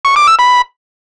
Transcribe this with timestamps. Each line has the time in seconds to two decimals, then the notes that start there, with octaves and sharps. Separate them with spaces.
0.05 C#6
0.16 D6
0.27 E6
0.39 B5